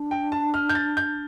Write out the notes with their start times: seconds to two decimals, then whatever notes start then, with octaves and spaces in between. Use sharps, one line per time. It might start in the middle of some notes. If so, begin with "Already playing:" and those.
Already playing: D4
0.11 G5
0.32 A5
0.54 F6
0.69 G6
0.75 A6
0.97 G6